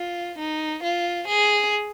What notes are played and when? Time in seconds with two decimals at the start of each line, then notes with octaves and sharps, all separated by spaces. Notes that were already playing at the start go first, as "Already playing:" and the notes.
Already playing: F4
0.38 D#4
0.83 F4
1.28 G#4